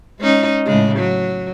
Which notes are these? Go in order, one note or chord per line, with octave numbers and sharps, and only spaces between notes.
G#3 C#4 D#4
A2 C#3 G#3
F#3